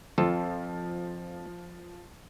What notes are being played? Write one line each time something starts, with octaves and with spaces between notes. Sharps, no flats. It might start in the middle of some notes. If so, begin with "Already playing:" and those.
F2 F3 F4 A4